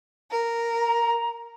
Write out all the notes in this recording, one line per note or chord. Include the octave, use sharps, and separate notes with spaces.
A#4
A#5